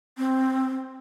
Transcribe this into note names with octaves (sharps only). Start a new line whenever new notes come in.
C4